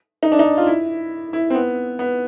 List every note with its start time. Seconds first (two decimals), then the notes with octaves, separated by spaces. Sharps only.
0.23 D#4
0.32 D4
0.39 D#4
0.57 F4
0.67 E4
1.33 E4
1.50 C4
1.55 B3
1.99 B3